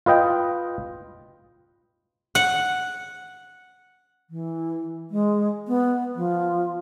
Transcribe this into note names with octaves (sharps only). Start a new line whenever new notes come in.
F4 B4 D#5 G5
F#5
E3
G#3
B3
F3